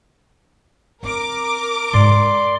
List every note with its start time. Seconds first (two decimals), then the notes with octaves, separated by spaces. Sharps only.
1.03 C4 A#4 D6
1.93 G#2 D5 C6